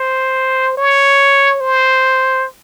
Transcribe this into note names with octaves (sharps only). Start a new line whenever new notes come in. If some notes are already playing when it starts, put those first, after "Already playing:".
Already playing: C5
C#5
C5